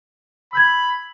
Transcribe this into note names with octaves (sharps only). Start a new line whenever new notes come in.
B5 E6 G6 G#6